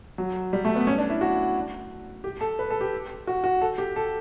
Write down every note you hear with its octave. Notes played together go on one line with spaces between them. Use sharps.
F#3
G3
A3
B3
C#4
D4
E4
F#4
G4
A4
B4
A4
G4
F#4
F#4
A4
G4
A4